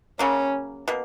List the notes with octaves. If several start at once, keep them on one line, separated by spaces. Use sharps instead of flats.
C#3 F#3 A#3 C#4
B2 A#3